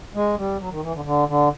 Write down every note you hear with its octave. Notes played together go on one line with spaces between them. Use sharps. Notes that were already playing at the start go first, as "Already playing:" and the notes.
G#3
G3
F#3
D#3
E3
D3
D3
D3